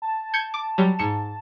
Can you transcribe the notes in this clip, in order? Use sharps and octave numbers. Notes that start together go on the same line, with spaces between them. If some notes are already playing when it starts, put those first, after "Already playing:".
A5
G6 G#6 C#7
D6
F#3 G3
G#2 C#7 E7